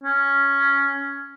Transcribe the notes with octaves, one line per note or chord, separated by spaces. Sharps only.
C#4